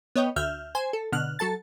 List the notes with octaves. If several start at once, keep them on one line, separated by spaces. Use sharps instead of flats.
B3 C#5 D#5 G5
D2 E5 F6 G6
C5 G#5
A4
B2 D3 F6 F#6
F#3 A4 A5 A6